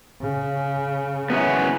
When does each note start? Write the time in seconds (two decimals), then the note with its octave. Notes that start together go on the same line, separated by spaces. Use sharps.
0.21 C#3
1.30 F#3 G#3 B3 C#4 E4